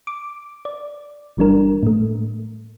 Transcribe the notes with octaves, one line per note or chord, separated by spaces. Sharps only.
D6
D5
G1 E3 G3 D4 A#4
A2 A3